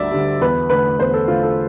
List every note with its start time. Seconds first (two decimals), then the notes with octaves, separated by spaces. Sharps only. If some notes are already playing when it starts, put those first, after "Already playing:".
Already playing: D2 D3 G3 D5 E5
0.12 D3 G3
0.41 E2 B4
0.70 D3 A3 B4
1.00 E2 C5
1.14 A4
1.28 D3 A3 F4
1.43 A4